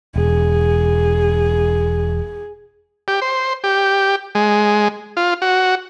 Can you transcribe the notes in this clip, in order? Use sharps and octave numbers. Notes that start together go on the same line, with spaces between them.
E1 G#4
G4
C5
G4
G#3
F4
F#4